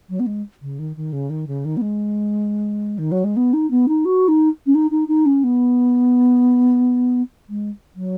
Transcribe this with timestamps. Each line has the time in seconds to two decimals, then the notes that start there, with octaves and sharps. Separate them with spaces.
0.10 F#3
0.20 B3
0.26 G#3
0.62 C#3
0.79 D#3
0.96 D#3
1.13 C#3
1.30 D#3
1.48 C#3
1.65 D#3
1.77 B3
1.81 G#3
2.98 D#3
3.12 F#3
3.24 G#3
3.37 B3
3.53 D#4
3.71 B3
3.88 D#4
4.05 F#4
4.28 D#4
4.66 C#4
4.75 D#4
4.91 D#4
5.08 D#4
5.26 C#4
5.44 B3
7.49 G#3
7.95 F#3